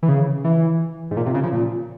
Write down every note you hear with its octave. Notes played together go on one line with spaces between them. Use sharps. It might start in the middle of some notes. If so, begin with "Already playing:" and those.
E3
C#3
E3
G#2
A#2
C3
C#3
F3
A#2